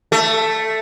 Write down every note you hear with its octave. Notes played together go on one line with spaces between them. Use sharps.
A3